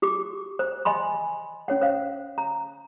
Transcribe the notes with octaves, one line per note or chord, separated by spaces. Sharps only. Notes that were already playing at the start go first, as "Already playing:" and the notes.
F#4 G4 D6
C5
D#5 G#5 B5 C6
C#4 C#5 F#5
C5 F5
A#5